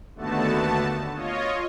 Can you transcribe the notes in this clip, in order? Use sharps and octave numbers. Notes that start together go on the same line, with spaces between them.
D#2 D3 A3 B3 F#4 A5
F4 C#5 D#5